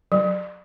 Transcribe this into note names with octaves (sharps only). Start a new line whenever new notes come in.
F#3